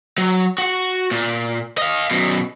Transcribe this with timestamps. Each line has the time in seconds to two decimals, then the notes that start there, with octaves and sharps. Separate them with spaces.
0.18 F#3
0.58 F#4 F#5
1.11 A#2
1.78 D#5 F5
2.11 F#2 B2